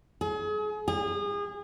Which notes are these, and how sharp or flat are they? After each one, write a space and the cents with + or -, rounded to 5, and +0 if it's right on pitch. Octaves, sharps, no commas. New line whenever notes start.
G#4 +35
G#4 -30